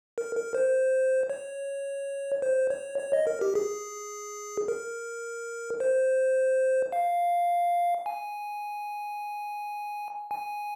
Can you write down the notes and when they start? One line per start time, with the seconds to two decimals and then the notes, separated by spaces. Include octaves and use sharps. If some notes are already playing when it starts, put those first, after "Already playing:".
0.18 A#4
0.36 A#4
0.55 C5
1.30 C#5
2.42 C5
2.70 C#5
2.98 C#5
3.13 D#5
3.27 A#4
3.41 G4
3.55 G#4
4.68 A#4
5.80 C5
6.92 F5
8.06 G#5
10.31 G#5